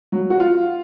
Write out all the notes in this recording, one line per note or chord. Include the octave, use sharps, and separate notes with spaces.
F#3
F#4
F4